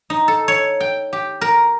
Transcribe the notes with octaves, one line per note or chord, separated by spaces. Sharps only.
D#4
A4
C#5
G5
G4
A#4